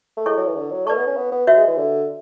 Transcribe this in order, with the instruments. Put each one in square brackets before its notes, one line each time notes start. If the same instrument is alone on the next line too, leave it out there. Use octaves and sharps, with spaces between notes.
[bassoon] A3
[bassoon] G#3 [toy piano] E4 A4 C#5 G#5 C#6
[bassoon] F#3
E3
D3
F#3
[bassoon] A3 [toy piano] B4 D5 A5 C#6
[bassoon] B3
C#4
B3
B3
[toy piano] F#4 C#5 E5
[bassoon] G#3
E3
D3